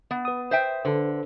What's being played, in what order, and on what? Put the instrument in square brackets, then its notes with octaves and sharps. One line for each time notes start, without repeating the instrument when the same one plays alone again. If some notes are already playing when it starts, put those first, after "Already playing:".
[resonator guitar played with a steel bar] B3
[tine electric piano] B4 D#6
[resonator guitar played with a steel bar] C5 E5 G5
[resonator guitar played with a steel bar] D3 [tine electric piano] A4 B4 C5